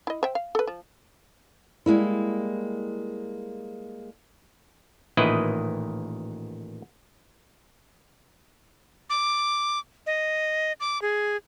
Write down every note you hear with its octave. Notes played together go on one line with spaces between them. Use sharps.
E4 D#5
C5 E5 G5
F5
A4 B4
F3
G3 G#3 A#3 E4
A1 A#2 D#3 E4 B4 D#5
D6
D#5
D6
G#4